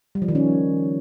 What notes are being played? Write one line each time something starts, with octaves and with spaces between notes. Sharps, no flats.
G3
F3
D#3
C#4